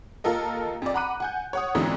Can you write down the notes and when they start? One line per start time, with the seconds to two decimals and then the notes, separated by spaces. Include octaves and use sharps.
0.24 D#2 F4 A4 A#4 D#5
0.82 F2 D5
0.94 F#5 A#5 B5 D6 F#6 D#7
1.20 F#5 G#5 G6
1.53 C#5 F#5 D#6
1.75 F2 G#2 B2 D3 E3 G#3